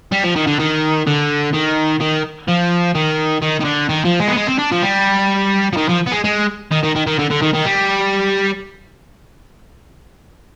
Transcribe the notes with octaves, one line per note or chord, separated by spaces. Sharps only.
G3
F3
D#3
D3
D#3
D3
D#3
D#3
F3
D#3
D#3
D#3
D3
D#3
F3
G#3
B3
G#3
C4
D4
F3
G3
F3
D#3
F3
B3
G#3
G#3
D#3
D#3
D#3
D#3
D3
D3
D#3
D#3
G3